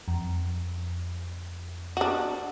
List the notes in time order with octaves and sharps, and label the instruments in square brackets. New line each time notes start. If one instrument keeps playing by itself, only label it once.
[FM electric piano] F2
[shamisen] D4 F#4